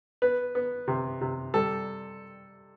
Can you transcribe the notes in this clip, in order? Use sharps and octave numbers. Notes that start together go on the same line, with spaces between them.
B3 B4
B3
C3
C3
G3 A4